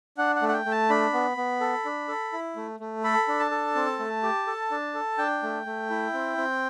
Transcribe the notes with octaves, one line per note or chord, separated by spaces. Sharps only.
D4 F#5
F#5
A3
F#5
G5
A3
A5
D4 B5
B3
B3
A4
D4
A4
E4
A3
A3
A4 B5
D4
A5
A4
C4
A3
G4
A4
D4
A4
D4 G5
A3
A3
E4
C4
C4